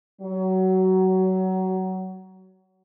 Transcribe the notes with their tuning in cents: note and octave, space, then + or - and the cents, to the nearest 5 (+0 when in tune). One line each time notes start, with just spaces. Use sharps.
F#3 +20